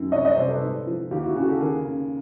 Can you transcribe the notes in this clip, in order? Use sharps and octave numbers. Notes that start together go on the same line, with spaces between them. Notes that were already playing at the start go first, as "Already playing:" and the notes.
Already playing: F#2 D#3
C2 C#5 D#5
C#5 D#5
C3 C5 D5
A4 B4
G#2
F3
D#2 F4 G4
E4 F#4
C#3 F#4 G#4
G4 A4
D#2 G#4 A#4
C#3